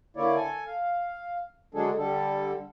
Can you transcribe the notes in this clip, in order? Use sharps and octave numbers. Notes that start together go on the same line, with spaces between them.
D3 A#3 E4 C#5 D5
A4 G#5
F5
D3 F#3 G#3 D4 G#4 A4
D3 G3 A4